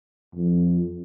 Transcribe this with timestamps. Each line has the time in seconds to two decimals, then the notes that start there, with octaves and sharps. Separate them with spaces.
0.34 F2